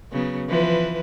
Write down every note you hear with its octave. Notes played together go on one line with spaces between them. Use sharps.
C#3 F#3 B3
E3 F3 B4